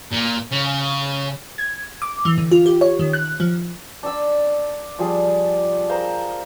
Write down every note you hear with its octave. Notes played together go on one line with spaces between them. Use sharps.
A#2
C#3
G#6
D6
E3
D3
F4
G4
C#5
D#3
F#6
F3
D4 E6
F3 G3 G#4
G#4 A#4 C5 F5